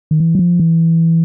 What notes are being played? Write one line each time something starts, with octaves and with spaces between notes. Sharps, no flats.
D#3
E3
F#3
F3
E3